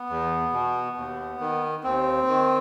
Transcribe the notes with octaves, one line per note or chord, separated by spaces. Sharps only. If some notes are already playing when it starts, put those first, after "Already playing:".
Already playing: B3
E2
B2
D#2
D#3
D#2 C4
D#3